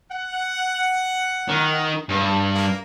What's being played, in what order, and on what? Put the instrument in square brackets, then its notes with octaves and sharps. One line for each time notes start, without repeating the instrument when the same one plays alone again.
[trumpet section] F#5
[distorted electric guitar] D#3
G2
[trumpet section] A#3